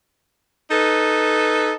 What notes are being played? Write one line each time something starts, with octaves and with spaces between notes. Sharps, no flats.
D#4 A4 B4